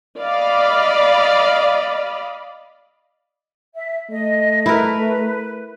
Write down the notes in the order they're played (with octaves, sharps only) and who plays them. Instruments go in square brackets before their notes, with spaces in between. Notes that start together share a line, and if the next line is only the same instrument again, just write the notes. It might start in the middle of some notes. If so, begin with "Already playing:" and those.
[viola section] D5 D#5 F5 B5
[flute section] E5
[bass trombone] A3 [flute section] D#5
[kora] E4 A#4 [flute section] B4